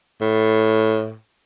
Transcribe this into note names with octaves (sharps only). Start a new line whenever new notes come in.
A2